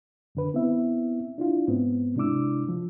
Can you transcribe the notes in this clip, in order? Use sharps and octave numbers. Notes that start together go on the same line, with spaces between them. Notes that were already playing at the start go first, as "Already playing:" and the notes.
F#2 D3 B4
B3 C4 E4 E5
D4 E4 F4
G#2 B3 C4
C3 G#3 D4 E4 D6 E6
F3